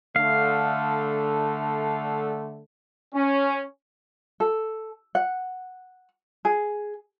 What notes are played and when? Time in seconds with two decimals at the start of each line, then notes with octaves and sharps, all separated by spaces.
0.16 D3 A3 F5
3.15 C#4
4.40 A4
5.15 F#5
6.45 G#4